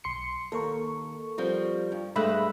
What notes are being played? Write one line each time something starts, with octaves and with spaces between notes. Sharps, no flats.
B1 C6 C#7
D#2 A4 A#4 C#6
F3 G3 C4
G2
G2 G#3 A3 B5 E6 F#6